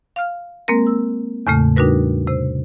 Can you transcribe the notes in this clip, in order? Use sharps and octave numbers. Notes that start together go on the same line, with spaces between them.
F5 F6
G#3 A#3 C4 A#4
E6
E2 A2 C#3 A3
G3 D4 D#4 F#4 A#4 B4
C3 C5